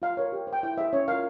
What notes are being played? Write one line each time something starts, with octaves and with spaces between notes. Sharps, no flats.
F4 F5
A#4 C#5
G4
C5
G5
E4 G5
G#4 C5 E5
C#4 C#5
F4 A#4 F5